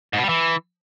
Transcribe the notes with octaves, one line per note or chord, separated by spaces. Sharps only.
G#2
B2
G3
E3